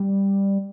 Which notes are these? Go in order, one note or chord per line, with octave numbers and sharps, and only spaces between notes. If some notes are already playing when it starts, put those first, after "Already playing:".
Already playing: G3